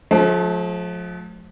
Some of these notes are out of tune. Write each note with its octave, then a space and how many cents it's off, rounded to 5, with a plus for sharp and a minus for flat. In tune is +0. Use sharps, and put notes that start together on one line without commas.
F3 +30 A3 -40 A5 +20